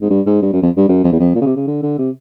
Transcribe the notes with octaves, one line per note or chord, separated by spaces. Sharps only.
G#2
G2
G#2
G2
F#2
F2
G2
F#2
F2
E2
F2
A#2
C#3
C3
C#3
D3
D3
C3